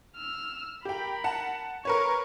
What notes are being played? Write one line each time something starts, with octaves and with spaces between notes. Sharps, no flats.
E6 F6
G4 A#4 G5 B5
F#5 A5
A#4 B4 C#5 C#6